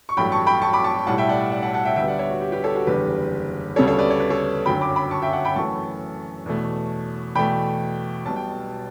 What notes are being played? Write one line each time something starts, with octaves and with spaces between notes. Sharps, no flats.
C#6
A1 G2 F#3 A3 G5 B5
A5 C#6
G5 B5
A5 C#6
B5 D6
A5 C#6
B1 A2 G3 F#5 A5
E5 G5
D5 F#5
D5 F#5
F#5 A5
F#5 A5
E5 G5
D2 D3 G3 B3 E5 G5
D5 F#5
C#5 E5
F#4
G4
G4 B4
A4 C#5
F#4 A4
F#1 E2 D3 G3 B3 G4 B4
D2 C#3 G3 B3 A4 C#5
A4 C#5
B4 D5
C#5
B4
A4 C#5
G1 F#2 D3 F#3 G5 B5
B5 D6
B5 D6
A5 C#6
E5 G5
F#5 A5
G5 B5
F#2 E3 A3 A5 C#6
E2 B2 A3
E2 B2 A3 G5 B5
B1 B2 G3 B3 A5
G5